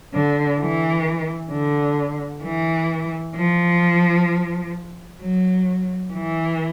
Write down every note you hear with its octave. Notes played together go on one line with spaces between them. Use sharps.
D3
E3
D3
E3
F3
F#3
E3